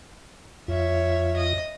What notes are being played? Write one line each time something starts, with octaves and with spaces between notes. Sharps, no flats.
F2 F4 C#5 E5
D#5